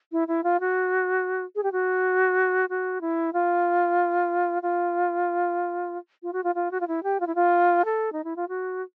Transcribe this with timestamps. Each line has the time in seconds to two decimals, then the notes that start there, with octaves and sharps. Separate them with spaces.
0.12 E4
0.28 E4
0.44 F4
0.60 F#4
1.55 G#4
1.63 G4
1.72 F#4
2.69 F#4
3.01 E4
3.33 F4
4.63 F4
6.23 F4
6.33 F#4
6.44 F4
6.55 F4
6.71 F#4
6.80 F4
6.88 E4
7.03 G4
7.20 F4
7.27 E4
7.35 F4
7.85 A4
8.13 D#4
8.24 E4
8.36 F4
8.48 F#4